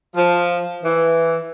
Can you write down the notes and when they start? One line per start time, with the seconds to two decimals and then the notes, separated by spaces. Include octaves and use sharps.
0.16 F3
0.83 E3